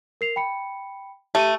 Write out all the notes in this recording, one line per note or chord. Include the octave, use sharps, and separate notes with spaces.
A#4 C7 F7
G5 B5 C#7
A3 G4 D#7